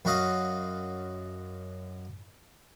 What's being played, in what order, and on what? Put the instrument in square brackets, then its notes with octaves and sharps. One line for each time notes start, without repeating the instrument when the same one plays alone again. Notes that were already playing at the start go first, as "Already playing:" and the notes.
[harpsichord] F#2 F#4 D#5 F5